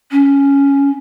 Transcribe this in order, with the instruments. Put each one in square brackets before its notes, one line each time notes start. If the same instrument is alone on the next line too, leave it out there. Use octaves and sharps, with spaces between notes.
[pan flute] C#4